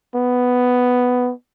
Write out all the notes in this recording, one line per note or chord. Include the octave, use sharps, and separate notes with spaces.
B3